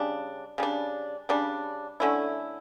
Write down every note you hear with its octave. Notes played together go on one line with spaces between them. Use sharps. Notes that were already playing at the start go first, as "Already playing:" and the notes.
Already playing: C#3 G3 D4
C#3 G3 D4
C#3 G3 D4
D3 A3 C#4 E4